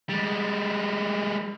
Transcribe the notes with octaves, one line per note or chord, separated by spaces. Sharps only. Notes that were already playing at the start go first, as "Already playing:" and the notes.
G3 G#3